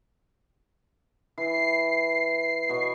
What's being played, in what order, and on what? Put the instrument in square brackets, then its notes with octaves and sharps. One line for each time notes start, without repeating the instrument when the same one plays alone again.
[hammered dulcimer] E3 [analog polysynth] C7
[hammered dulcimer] B2 B4 C#5